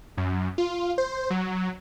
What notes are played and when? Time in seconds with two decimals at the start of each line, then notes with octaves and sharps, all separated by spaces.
0.17 F#2
0.58 F4
0.98 C5
1.30 F#3